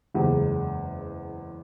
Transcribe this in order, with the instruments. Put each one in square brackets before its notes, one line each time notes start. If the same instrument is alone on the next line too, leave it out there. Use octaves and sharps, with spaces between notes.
[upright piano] F#1 E2 C#3 G#3